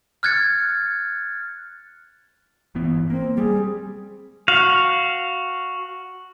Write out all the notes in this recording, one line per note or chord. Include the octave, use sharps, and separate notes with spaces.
F6 F#6 G#6 A6 C#7
G1 E3 B3
A#3 C4
G3 G#4
F#4 F5